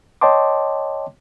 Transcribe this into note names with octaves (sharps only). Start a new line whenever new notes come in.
C#5 D#5 G5 A5 C6 D6